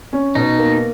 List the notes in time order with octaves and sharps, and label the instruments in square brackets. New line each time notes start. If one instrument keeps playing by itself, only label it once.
[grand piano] C#4
[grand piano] B2 [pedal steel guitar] D#4
[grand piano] A#3